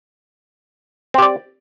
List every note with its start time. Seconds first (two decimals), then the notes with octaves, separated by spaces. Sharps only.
1.14 C4
1.18 G4
1.22 D5